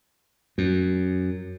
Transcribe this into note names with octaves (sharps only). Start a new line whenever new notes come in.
F#2